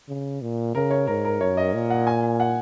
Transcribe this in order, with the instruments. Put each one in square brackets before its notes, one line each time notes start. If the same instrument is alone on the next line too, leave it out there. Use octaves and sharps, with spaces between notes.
[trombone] C#3
A#2
[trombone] C#3 [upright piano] A#4
[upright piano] C#5
[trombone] G#2 [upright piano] A#4
[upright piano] A#4
[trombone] F#2 [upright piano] C#5
[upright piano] D#5
[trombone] A#2
[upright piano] F#5
G#5
F#5